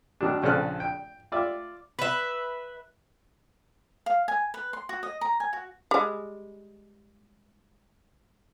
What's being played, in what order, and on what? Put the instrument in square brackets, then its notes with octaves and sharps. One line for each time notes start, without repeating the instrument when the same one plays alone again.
[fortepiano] B2 D#3 F#3 D4
A#1 C#3 C4 A4 F6 F#6
G5
F4 D5 E5
[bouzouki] B4 E5
[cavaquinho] F5
G#5
B4
C6
F#4
D#5
A#5
G#5
F#4
[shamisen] G3 G#3